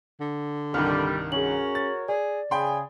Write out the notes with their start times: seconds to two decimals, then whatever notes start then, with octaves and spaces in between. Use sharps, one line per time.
0.20 D3
0.74 C2 G2 D#3 G3 F6
1.32 C#4 F#4 G#4 A#4 C#5 F#7
1.75 A6
2.08 G#4 D5
2.51 C#3 G#4 G5 B5 C6